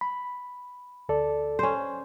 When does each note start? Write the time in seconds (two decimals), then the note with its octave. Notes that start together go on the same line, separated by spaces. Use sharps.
0.01 B5
1.09 D2 A4 D5
1.59 C#4 C5